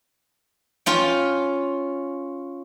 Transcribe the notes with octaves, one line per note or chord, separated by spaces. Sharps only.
C#4 F4 G5